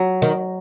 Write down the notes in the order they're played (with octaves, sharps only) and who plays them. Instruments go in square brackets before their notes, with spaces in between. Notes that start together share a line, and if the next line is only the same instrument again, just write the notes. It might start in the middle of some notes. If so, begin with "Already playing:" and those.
Already playing: [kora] F#3
[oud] D#3